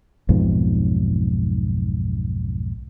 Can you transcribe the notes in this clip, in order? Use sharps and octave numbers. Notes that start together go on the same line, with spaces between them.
B1 F2 G#2